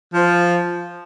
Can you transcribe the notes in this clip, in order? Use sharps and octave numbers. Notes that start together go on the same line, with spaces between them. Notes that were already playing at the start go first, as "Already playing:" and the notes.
F3